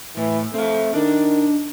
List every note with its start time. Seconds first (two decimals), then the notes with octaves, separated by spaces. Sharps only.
0.17 A2 E3
0.54 A3 C4 F5
0.94 D#3 D4